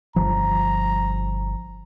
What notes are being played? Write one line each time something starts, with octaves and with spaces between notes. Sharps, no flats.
G1 F3 A#5